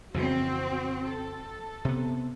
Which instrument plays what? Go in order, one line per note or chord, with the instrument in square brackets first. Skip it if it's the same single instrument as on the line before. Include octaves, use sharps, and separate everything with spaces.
[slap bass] F2 C#3 E3 [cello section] C4 F#4
[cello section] A4
[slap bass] C3 B3